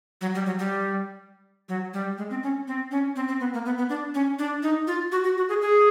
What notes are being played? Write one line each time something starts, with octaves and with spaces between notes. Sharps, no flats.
F#3
G3
F#3
G3
F#3
G3
G#3
C4
C#4
C4
C#4
C4
C4
B3
A#3
B3
B3
D4
C#4
D4
D#4
F4
F#4
F#4
F#4
G#4
G#4